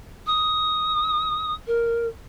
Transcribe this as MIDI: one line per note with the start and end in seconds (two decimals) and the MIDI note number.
0.26 1.54 87
1.67 2.06 70